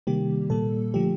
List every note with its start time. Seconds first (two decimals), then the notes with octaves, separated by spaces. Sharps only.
0.07 C3 D#3 G3 A#3 G4
0.50 A#2 G3 A#3 A4
0.94 D3 F3 A3 G4